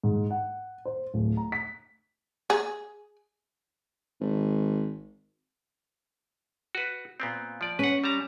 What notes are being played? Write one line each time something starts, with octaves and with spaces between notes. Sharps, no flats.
G#2
F#5
C5
D1
A#5
B6
G#4
G#1
F#4 B4
A#2 B3 C4
F3 D5
C#4 B4 F#5
G3 A5 A#5